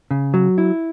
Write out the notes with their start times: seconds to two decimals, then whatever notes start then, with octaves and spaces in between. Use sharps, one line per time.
0.11 C#3
0.34 F#3
0.58 E4